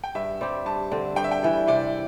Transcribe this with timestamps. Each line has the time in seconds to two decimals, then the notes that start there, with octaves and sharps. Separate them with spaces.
0.04 G5
0.15 G2 E5
0.41 G3 C4 G4
0.66 G2 A5
0.92 D3 C4
1.16 G2 G5
1.24 E5
1.31 G5
1.43 E3 G3
1.67 C3 D5